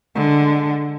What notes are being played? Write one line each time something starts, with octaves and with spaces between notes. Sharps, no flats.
D3 G#3